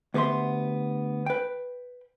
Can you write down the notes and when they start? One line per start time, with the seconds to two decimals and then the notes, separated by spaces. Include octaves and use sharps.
0.14 D2 B3 G4 E5 C6
1.26 B4 G5